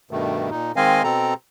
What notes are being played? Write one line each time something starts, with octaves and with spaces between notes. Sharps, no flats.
G2 B2 D#3 A3
A#2 D#4
D#3 G#3 C4 D#5 F5 G#5
B2 C4 A4 A#5